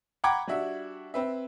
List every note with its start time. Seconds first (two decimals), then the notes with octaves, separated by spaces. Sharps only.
0.24 F#5 G5 A#5 B5 D6 G#6
0.47 G3 D4 F#4 E5
1.14 C4 B4 E5